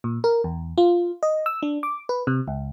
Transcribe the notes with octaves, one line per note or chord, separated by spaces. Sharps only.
A#2
A#4
E2
F4
D#5
E6
D4
D6
B4
C3
C#2